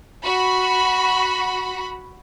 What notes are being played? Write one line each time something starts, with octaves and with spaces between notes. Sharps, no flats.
F#4 B5